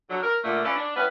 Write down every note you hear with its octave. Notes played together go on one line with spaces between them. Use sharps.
D3 F#3
A#4
A#2 D3 A3
C#4 F4 A4 B4 C#5 D5
D4
G3 B3 C#4 E4 B4